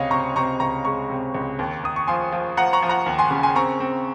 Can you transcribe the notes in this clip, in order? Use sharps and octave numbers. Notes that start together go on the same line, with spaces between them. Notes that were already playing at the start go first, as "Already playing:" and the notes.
Already playing: C#2 C3 C#5 D#5 F5
C3 A#5 C#6
C3 A#5 C#6
C#2 A#5 C#6
G#3 A#5 C#6
C3
C#2
D#2
D#2 D#6
C#6
F3 G#5 C6
F3
F3 F#5 A#5
A#5 C#6
F3
F#5 A#5
D#2
G#5 C6
C#3
G#5 C6
C4 A#5 C#6
C4